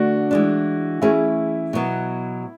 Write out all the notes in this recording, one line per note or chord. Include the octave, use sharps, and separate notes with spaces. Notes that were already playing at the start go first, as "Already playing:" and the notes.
Already playing: D3 A3 D4 F#4
E3 G#3 D4
E3 A3 C#4 E4 G#4
B2 F#3 B3